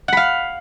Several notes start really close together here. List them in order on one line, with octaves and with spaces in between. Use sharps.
F#5 B5 F5